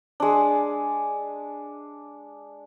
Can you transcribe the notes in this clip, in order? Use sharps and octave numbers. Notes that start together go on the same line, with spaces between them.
G#3 D4